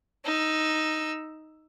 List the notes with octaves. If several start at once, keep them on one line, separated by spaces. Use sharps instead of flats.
D#4 E6